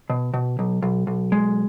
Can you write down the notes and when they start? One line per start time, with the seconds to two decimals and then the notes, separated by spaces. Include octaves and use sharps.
0.10 B2
0.34 B2
0.59 B1
0.83 B1
1.07 B1
1.32 G#3